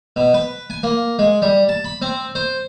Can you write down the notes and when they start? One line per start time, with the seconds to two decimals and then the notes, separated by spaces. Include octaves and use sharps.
0.16 B2
0.34 B4
0.70 G#5
0.83 A#3
1.19 G#3
1.42 G3
1.69 A5
1.84 B5
2.02 C4
2.35 C5